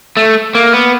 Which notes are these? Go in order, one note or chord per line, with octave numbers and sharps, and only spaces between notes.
A3
A#3
B3